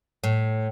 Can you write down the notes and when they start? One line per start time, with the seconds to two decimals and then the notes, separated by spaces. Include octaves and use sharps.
0.24 A2